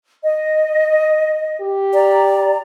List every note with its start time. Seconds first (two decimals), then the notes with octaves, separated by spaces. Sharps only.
0.23 D#5
1.61 G4
1.94 D5 A#5